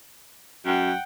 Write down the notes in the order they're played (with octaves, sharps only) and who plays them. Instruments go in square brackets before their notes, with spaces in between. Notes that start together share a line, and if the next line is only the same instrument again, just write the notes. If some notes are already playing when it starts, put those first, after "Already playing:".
[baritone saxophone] F#2 [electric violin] F#5 G5